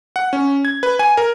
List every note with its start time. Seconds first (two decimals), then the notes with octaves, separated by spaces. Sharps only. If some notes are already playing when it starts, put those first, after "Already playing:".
0.16 F#5
0.33 C#4
0.65 G#6
0.83 B4
0.99 G#5
1.17 A#4